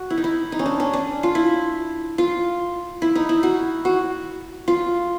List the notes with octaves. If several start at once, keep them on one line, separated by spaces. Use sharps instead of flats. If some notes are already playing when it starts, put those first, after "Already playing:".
Already playing: F#4
E4
D#4
E4
D#4
C#4
D4
C#4
D4
F4
E4
F4
E4
D#4
E4
F#4
F#4
F4